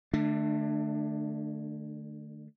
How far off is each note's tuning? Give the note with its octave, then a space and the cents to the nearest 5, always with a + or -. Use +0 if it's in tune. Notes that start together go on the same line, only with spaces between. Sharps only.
D3 +45 A3 +0 D4 +20